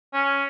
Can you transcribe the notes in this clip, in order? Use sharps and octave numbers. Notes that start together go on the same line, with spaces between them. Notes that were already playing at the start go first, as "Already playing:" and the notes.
C#4